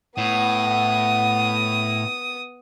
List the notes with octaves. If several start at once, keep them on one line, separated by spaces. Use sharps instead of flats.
A2 B3 F#5 D#6